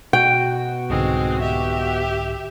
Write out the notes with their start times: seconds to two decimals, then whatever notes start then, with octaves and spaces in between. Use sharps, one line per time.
0.13 B2 F#4 G5
0.90 C2 G#2 D3 G#3 C4
1.41 G4 E5